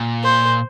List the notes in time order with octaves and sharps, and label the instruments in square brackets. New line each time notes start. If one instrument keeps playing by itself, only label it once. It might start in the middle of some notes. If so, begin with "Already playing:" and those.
Already playing: [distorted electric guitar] A#2
[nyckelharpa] C5